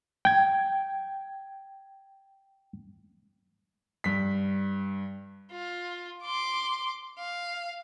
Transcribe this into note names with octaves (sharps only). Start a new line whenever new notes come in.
G5 G#6
G2 B6
F4
C6 D6
F5